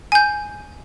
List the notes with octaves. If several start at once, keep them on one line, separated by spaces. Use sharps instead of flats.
G#5 G6